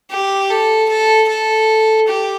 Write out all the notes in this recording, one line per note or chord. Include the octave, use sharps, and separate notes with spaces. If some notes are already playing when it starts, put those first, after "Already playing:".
G4
A4
A4
A4
G4